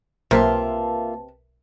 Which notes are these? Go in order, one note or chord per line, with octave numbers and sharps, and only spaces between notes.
B1 C3 A#3 F4 A#4 B4 E5 A5